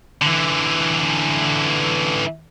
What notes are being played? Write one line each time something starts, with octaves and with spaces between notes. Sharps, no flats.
D3 E3